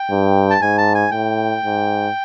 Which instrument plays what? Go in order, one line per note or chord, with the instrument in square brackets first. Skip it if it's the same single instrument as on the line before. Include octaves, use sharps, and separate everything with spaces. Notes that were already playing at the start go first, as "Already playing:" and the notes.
Already playing: [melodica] G5
[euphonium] G2
[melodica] A5
[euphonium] G#2 [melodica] G#5
[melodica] A5
G#5
[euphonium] A2 [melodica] G5
[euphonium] G#2